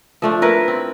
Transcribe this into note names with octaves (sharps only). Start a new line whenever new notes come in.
F3 A3 D4
E4 A#4 B4
C4